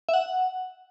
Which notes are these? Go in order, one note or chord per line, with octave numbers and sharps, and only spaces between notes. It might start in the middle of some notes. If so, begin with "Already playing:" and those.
E5
F#5